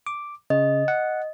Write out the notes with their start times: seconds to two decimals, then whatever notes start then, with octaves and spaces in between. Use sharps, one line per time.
0.07 D6
0.50 C#3 D#5
0.88 F#5